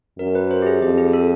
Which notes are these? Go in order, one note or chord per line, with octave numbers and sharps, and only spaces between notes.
F#2 A#4
B4
C5
G4
G#4
F2 G4
G#4
A4